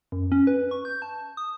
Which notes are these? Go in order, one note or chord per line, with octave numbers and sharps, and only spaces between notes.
F#2
C#4
B4
C#6
G6
A5
D#6